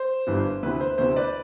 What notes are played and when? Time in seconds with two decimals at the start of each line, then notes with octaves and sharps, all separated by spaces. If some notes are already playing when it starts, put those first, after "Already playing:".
Already playing: C5
0.27 G1 G2 E3
0.63 D2 C3 E3 B4
0.81 C5
0.98 D2 C3 E3 C5
1.16 B4 D5